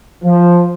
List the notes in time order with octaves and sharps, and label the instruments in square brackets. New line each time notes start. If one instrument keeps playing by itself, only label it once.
[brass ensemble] F3